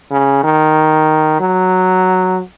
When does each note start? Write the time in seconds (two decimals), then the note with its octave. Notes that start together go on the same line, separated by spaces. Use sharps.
0.11 C#3
0.44 D#3
1.40 F#3